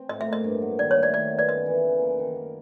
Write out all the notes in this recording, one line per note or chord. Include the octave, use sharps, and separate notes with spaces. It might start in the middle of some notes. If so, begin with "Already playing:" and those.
Already playing: C4
A2 D#5
E5
A#3
D#5
G2
F#3
D#3 D5
C#5
A3
D5
D#3 D5
B3
D5
F#2 D#5
E3
C#3
A#3
D#3
A#3